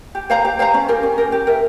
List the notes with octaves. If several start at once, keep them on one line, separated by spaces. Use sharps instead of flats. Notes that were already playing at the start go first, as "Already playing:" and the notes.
G4
C5 F5 A#5
G4
C5 F5 A#5
C#4
G4 A#4
C#4
G4 A#4
G4
A#4 E5